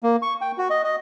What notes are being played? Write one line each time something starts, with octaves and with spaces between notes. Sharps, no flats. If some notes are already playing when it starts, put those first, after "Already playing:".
A#3
C#6
G5
F#4
D#5
D#5